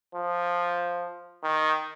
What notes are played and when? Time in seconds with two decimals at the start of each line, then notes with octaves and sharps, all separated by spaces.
0.15 F3
1.44 D#3